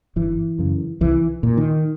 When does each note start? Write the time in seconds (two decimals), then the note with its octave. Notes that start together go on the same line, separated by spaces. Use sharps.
0.16 G1 E3
0.59 F#2 C#3
1.01 C2 E3
1.43 A#2
1.57 D#3